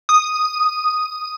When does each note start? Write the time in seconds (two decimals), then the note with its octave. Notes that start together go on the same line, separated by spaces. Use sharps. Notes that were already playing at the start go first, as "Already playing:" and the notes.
0.09 D#6